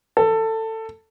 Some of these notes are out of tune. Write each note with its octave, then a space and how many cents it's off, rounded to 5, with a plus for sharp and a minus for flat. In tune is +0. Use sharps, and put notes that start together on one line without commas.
A4 +20